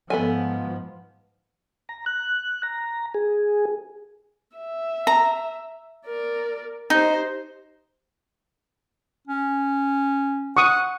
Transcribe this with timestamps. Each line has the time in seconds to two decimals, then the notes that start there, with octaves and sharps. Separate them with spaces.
0.10 G#2 F3 B3 A4 G#5
1.89 A#5
2.06 F#6
2.63 A#5
3.14 G#4
4.57 E5
5.07 A#5
6.06 A#4 D5
6.90 D#4 G4 C5
9.27 C#4
10.57 F#5 C#6 D#6